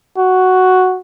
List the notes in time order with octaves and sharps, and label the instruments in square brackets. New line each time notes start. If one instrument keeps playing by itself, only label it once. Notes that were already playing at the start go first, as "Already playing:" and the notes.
[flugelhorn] F#4